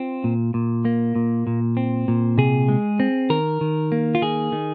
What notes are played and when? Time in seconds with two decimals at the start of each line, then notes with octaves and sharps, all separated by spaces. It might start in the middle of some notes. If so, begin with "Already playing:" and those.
Already playing: C4 F4
0.24 A#2
0.54 A#2
0.85 A#3
1.16 A#2
1.47 A#2
1.77 C4
2.08 A#2
2.38 C3 G#4
2.69 G#3
3.00 C4
3.30 D#3 A#4
3.61 D#3
3.92 A#3
4.15 F4
4.22 D#3 G#4
4.52 D#3